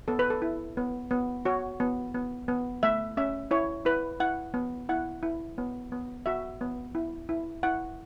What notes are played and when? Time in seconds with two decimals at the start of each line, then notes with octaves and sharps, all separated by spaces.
0.08 B3 A4
0.19 B4
0.30 A4
0.42 E4
0.77 B3
1.11 B3
1.45 F#4 C#5
1.80 B3
2.15 B3
2.48 B3
2.83 A3 E5
3.17 C#4 E5
3.51 E4 C#5
3.85 E4 B4
4.20 E4 F#5
4.54 B3
4.89 E4 F#5
5.23 E4
5.58 B3
5.92 B3
6.26 F#4 E5
6.61 B3
6.95 E4
7.29 E4
7.63 E4 F#5